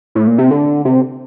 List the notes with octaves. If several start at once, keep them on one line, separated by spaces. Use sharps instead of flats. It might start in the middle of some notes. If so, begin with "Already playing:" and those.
A2
A#2
C3
D3
C3